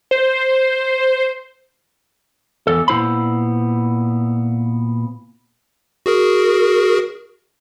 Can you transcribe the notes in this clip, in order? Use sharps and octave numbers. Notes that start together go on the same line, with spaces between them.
C5
E2 A4
A#2 B3 E4 C5 B5
F#4 G#4 A#4